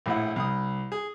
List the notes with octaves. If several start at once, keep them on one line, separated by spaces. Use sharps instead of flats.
A#1 A2 E4 F#5
C2 D#6
G#4